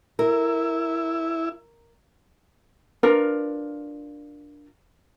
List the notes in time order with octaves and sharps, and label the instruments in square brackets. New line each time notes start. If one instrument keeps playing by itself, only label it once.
[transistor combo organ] E4 [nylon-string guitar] A#4
[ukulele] D4 F4 A#4 B4